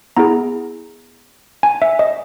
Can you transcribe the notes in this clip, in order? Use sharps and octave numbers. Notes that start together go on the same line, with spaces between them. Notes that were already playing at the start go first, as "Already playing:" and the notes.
B3 E4 G#4 A#5
G#5
E5
D#5